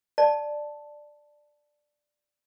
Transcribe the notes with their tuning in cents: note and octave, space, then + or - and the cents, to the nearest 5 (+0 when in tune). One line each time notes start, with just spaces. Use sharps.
D5 +10 A5 +0